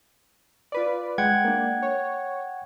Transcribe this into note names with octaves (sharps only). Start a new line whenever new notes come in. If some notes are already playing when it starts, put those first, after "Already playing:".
F4 B4 D5
G#3 F#5 G5 G#6
A#3 D4
C#5